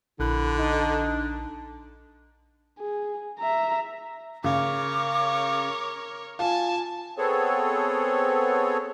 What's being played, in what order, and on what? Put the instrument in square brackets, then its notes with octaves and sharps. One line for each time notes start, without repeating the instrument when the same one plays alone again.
[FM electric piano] A#1 F#6 [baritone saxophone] D3 [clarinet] E4
[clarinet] D4 [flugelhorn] D#4
[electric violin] G#4
E5 A#5
[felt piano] C#3 [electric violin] A#4 C#5 [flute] D6
[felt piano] F4 [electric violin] G#5 A5
[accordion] B3 C4 G#4 A4 C#5